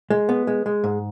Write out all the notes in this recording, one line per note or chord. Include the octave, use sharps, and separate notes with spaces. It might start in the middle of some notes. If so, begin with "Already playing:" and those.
G#3
B3
G#3
G#3
G#2